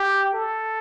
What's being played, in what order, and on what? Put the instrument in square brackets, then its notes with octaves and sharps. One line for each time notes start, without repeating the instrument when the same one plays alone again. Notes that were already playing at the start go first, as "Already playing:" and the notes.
Already playing: [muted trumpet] G4
A4